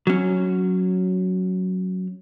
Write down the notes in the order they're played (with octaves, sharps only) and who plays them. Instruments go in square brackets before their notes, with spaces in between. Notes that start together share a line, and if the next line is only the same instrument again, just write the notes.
[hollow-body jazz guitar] F#3 C#4